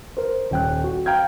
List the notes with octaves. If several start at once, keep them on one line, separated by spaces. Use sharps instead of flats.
A#4 C5
D#1 G5 F#6
F#4
F5 G5 A#5 F6 G6 G#6